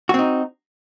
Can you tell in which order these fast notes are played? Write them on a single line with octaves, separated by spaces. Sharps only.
F#4 C4 D#4